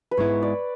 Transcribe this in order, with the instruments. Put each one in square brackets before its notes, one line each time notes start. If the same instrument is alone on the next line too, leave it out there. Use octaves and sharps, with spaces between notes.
[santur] B4
[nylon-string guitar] G#2 G#3 B3 E4 [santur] C#5
[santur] D5